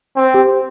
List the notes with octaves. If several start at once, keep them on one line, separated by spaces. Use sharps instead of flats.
C4
G4